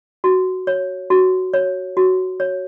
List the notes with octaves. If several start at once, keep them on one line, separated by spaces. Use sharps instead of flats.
F#4
C#5
F#4
C#5
F#4
C#5